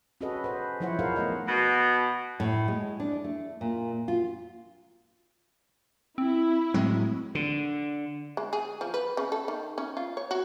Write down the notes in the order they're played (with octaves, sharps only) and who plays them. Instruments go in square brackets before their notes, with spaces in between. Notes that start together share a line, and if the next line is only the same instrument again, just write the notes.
[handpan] C#4 F#4 G#4 A4 B4 D#5
B4 C5
F3 F#3 E4 C5 C#5 F#5
D#4 F4 G#4 A#4 C5 F5
A3 B3 D#5 F#5
[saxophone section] B2
[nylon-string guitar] A2
G#3
D4
A3
A#2
F4
[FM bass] C4 [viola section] E4
[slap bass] A2 F#3 G#3 [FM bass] C4
[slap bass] D3
[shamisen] G#3
G#4
F3
B4
C#3
A4
D#3
C#4
F4
C#5
F#4